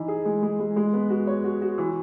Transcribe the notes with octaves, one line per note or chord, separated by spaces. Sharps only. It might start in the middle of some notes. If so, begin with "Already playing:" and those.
Already playing: E3 D#4
G#4
G#3
G#3
G#3
G#3
B3
F#4
C#5
F#4
F#4
E3